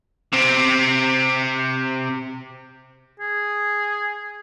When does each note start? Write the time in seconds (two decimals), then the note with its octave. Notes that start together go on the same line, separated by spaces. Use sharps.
0.33 C3 C4
3.20 G#4